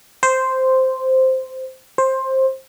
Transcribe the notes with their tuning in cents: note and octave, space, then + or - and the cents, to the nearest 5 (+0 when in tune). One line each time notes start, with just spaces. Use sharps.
C5 -5
C5 +15